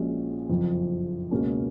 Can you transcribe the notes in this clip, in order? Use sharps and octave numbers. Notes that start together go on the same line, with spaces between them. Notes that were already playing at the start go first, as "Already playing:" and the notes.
Already playing: A#1 A#2 G#3 C#4 F#4
F#1 F2 F3
C#2 B2 A#3 C#4